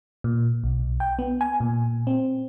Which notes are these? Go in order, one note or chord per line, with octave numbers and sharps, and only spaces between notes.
A#2
B1
G5
B3
G#5
A#2
C4